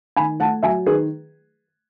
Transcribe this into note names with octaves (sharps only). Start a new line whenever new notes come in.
D#3 G#5 B5
A3 F#5 A5
F#3 E5 G#5
D#3 G#4 B4